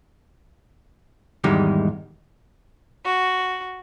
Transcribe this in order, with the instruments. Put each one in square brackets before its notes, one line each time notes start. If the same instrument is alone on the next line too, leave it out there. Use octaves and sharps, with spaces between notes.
[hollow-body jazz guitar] E2 G#2 D#3 G3 G#3
[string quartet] F#4